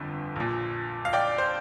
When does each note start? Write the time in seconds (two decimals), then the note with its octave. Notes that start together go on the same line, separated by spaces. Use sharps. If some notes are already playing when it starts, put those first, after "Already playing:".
Already playing: G1 F2 D3
0.36 A#1 A#2
1.05 F5
1.13 D5 G5
1.38 C5